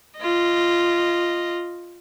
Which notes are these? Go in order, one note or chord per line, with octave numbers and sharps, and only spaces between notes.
F4 D#5